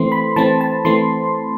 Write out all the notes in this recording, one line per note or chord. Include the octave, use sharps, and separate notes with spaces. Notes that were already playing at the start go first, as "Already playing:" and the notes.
Already playing: E3 A3 C4 C6
B5
E3 A3 C4 A5
A5
E3 A3 C4 C6